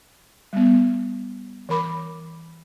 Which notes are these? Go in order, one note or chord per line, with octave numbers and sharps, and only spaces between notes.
G3 B3
E3 A#4 B5 D6